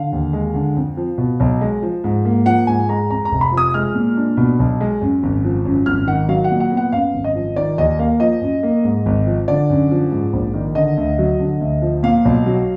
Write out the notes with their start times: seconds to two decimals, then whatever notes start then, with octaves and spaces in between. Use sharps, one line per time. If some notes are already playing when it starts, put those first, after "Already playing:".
Already playing: D3 F5
0.13 D#2
0.33 G#3
0.54 D3
0.76 F2
0.97 F3
1.18 B2
1.40 B1
1.61 G#3
1.83 F3
2.04 G#2
2.25 A#3
2.45 F3 F#5
2.67 G#2 G#5
2.89 G#3 A#5
3.10 F2 A#5
3.25 A#5
3.32 F1
3.41 B5
3.52 F3
3.57 D#6
3.74 G#3 F6
3.95 A#2
4.17 D4
4.37 B2
4.59 B1
4.81 G#3
5.01 F#2
5.23 G#1
5.44 F3
5.65 F#2
5.86 G#1 F6
6.07 D#3 F#5
6.28 F#3 F5
6.44 F#5
6.51 A#2
6.60 F#5
6.72 B3
6.77 F#5
6.92 F#2 F5
7.14 G#1
7.24 D#5
7.35 F3
7.56 D#3 D5
7.78 D#2 D#5
7.99 A#3 F5
8.20 F3 D#5
8.41 F#2
8.63 A#3
8.84 G#2
9.06 G#1
9.27 F3
9.48 D3 D5
9.70 F#2
9.91 F3
10.11 G#2
10.33 A#1
10.54 D#3
10.75 D3 D#5
10.97 D2
11.19 F#3
11.39 D3
11.61 D2
11.82 F3
12.03 A#2 F5
12.25 B1
12.46 F#3